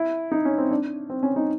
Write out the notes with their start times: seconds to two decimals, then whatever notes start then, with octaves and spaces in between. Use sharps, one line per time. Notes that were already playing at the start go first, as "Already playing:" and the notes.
Already playing: E4
0.32 D#4
0.45 C#4
0.58 C4
0.71 D4
1.10 C4
1.23 C#4
1.36 D#4